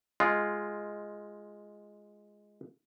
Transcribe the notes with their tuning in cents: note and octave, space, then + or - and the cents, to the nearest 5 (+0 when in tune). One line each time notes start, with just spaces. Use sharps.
G#3 +0 F4 +0